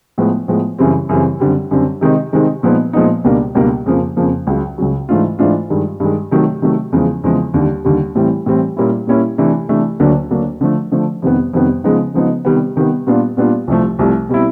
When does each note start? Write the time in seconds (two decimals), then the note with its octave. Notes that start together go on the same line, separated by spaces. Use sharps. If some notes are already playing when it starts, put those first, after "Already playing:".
0.18 A2 F3 G#3 B3
0.48 A2 F3 G#3 B3
0.79 F#2 C#3 E3 G3 C4
1.09 F#2 C#3 E3 G3 C4
1.40 F#2 D3 G3 C4
1.71 F#2 D3 G3 C4
2.01 C3 D#3 G#3 C4 D#4
2.32 C3 D#3 G#3 C4 D#4
2.63 A#2 F3 G#3 B3 D#4
2.93 A#2 F3 G#3 B3 D#4
3.24 C#2 B2 G3 A#3 D4
3.55 C#2 B2 G3 A#3 D4
3.86 F2 C#3 F3 A#3
4.17 F2 C#3 F3 A#3
4.47 C#2 C#3 F#3
4.78 C#2 C#3 F#3
5.09 G#2 E3 A3 D4 F4
5.39 G#2 E3 A3 D4 F4
5.70 G2 D#3 G#3
6.00 G2 D#3 G#3
6.31 C3 D#3 F#3 A3
6.62 C3 D#3 F#3 A3
6.92 E2 C#3 F3 G#3
7.24 E2 C#3 F3 G#3
7.54 D#2 D3 G3
7.85 D#2 D3 G3
8.15 A2 E3 G3 C4
8.46 A2 E3 G3 C4
8.77 A#2 G3 A#3 C#4 E4
9.07 A#2 G3 A#3 C#4 E4
9.38 C3 E3 A3 D4
9.69 C3 E3 A3 D4
10.00 D2 D3 F#3 A#3 D4
10.30 D2 D3 F#3 A#3 D4
10.61 D3 F3 A3
10.91 D3 F3 A3
11.22 F2 C3 D#3 G3 B3
11.53 F2 C3 D#3 G3 B3
11.84 C#3 F3 G#3 B3 D#4
12.14 C#3 F3 G#3 B3 D#4
12.45 C3 D#3 G3 B3
12.76 C3 D#3 G3 B3
13.07 A#2 G3 B3 D4 F4
13.37 A#2 G3 B3 D4 F4
13.68 C2 C3 F3 A3
13.99 C2 C3 F3 A3
14.29 B2 G3 C4 E4